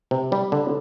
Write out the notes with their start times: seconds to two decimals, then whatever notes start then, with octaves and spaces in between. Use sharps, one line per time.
0.11 C3
0.32 G3
0.52 D3